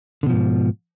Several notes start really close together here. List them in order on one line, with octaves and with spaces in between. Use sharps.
D3 B2 F3 G#2